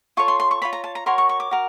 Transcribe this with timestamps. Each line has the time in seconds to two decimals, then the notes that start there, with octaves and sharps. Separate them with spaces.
0.17 F4 A4 C#5 C#6
0.28 C6
0.40 C6
0.51 C#6
0.62 F4 A4 C#5 B5
0.73 A#5
0.84 A5
0.95 A#5
1.06 F#4 A#4 C#5 C6
1.18 C#6
1.29 C#6
1.40 D6
1.51 F#4 A#4